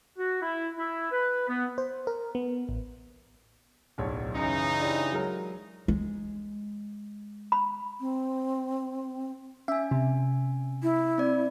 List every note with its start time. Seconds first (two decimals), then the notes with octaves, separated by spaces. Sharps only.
0.18 F#4
0.42 E4
0.77 E4
1.12 B4
1.49 B3
1.78 C5
2.07 A#4
2.35 B3
2.69 A1
3.98 D1 B1 C#5
4.36 F#2 C#3 E3 D#4 C#7
4.81 D4 E4 G4
5.12 F#3 G#3 A#4
5.88 G#3
7.52 B5
8.00 C4
9.68 C#4 E5 G#5
9.91 C3
10.83 E4
11.18 C4 D5